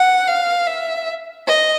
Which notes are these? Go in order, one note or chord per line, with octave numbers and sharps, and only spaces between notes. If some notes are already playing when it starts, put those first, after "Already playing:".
Already playing: F#5
F5
E5
D#5